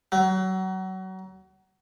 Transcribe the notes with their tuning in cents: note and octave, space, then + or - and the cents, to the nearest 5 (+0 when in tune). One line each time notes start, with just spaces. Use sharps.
F#3 +30